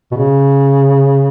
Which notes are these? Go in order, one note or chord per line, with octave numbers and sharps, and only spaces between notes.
B2
C#3